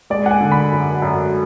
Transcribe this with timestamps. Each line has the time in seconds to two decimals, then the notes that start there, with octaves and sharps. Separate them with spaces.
0.10 G#3 D5
0.26 F#5
0.31 G#5
0.40 D3
0.52 B5
0.72 F#2
1.02 F#2